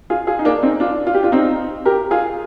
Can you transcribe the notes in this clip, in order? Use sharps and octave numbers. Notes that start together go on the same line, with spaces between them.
F4 G#4
F4 G#4
D#4
A#3 D4
C4 D#4
D4 F4
F4
G4
D4 F4
C4 D#4
G4 A#4
F4 G#4